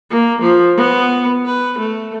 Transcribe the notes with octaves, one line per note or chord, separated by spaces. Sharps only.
A#3
F3
B3
B4
A3